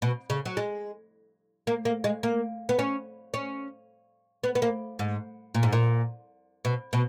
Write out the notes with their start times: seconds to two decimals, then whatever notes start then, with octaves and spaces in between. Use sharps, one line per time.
0.02 B2
0.30 C#3
0.45 F#3
0.57 G#3
1.67 A#3
1.85 A#3
2.04 G#3
2.23 A#3
2.69 B3
2.79 C#4
3.34 C#4
4.43 B3
4.55 B3
4.62 A#3
4.99 G#2
5.55 A#2
5.63 G#2
5.73 A#2
6.65 B2
6.93 B2